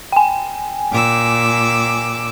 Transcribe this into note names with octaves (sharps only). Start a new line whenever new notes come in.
G5 G#5
A#2 D6 E6